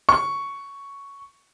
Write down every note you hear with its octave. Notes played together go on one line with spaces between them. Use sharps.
C#6